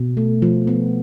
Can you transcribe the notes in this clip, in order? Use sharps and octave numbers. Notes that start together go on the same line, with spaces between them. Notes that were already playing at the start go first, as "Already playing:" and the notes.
Already playing: B2
A3
F3
B3